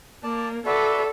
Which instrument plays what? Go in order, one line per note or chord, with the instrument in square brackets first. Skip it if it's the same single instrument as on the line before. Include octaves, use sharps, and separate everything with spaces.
[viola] A#3 [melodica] D5 A5
[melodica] F#4 B4 E5 [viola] A4 [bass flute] D5